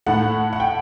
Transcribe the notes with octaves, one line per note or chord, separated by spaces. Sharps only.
A2 A3 F#5
F#5
G5